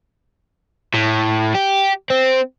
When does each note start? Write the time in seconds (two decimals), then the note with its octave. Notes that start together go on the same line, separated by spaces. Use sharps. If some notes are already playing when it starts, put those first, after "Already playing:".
0.94 A2
1.54 G4
2.10 C4